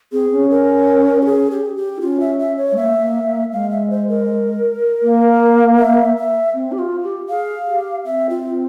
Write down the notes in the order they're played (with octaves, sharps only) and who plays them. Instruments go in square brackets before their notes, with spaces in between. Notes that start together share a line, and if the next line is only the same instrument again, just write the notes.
[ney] C4 [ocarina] G#4
[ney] C#4
[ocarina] A#4
G4
G#4
G4
G4
[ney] E4
[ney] C#4 [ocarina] F4
[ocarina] E5
E5
C#5
[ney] G#3
[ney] A#3 [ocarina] E5
[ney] A#3
A#3
[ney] G#3 [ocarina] F5
[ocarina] E5
C5
A#4
[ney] A#3
[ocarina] E5
E5
[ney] C4
G4
F4
G4
[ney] G#4 [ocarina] F5
[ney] G4
[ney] C4 [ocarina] E5
[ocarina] F4